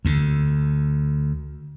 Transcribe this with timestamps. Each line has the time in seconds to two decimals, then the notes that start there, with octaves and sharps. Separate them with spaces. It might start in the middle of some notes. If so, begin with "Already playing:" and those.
0.05 D2 D3